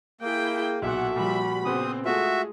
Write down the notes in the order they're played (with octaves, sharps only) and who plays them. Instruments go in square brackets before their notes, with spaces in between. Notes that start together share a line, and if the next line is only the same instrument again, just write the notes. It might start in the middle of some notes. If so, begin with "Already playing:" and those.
[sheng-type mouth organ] A#3 [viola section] E4 G#4 G5
[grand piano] B1 A#2 [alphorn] F#4 [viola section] A4 F#5 [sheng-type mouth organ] E5
[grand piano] A#2 F3 [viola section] G3 B5
[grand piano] A#2 C#3 B3 [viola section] C4 [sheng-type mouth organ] D#6
[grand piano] G#3 A3 F4 [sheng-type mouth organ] F#4 E5 [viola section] G#4